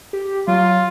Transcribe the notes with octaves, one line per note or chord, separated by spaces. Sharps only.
G4
F#3 F4